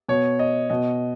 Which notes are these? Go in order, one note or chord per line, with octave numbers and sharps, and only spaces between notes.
B2 C#5
D#5
B2 D#5